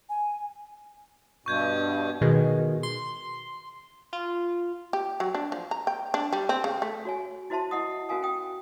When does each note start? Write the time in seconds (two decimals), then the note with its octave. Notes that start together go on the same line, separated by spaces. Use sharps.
0.09 G#5
1.46 G2 B2 C#6 G6 G#6
2.21 B2 D#3 G#3
2.83 C6
4.13 F4
4.93 G4
5.20 F#3
5.35 D4
5.52 F3
5.71 A#5
5.87 G5
6.14 D4
6.33 G3
6.49 C4
6.64 C#3
6.82 A3
7.05 F#4 C#5 G#5
7.50 E4 F#4 C5 E5 A5 C6
7.71 E4 D#5 F#5 D#6
8.09 C#4 F#4 A#4 F5 G#5 D#6
8.23 G5 D#6